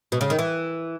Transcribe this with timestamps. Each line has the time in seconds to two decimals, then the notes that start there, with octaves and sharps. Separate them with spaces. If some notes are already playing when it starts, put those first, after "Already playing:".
0.12 B2
0.21 C#3
0.30 D#3
0.39 E3